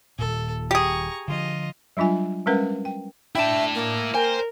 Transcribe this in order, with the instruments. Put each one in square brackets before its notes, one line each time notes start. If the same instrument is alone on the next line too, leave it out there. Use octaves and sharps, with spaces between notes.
[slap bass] D#1 A#2 [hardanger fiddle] A4
[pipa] G4 G#4 [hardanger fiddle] A#5 C#6
[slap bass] D3 E3 F3 [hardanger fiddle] F4 D#5
[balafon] F#3 G3 D4 F4 G#5
G3 G#3 C#4 A#4 B4 F#5
G5
[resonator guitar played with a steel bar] D4 G5 [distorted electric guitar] E4 A5 [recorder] E5
[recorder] A#3
[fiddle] A#4 [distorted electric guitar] C5 [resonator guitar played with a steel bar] G5 G#5